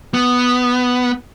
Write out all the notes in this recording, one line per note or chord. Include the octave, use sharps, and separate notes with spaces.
B3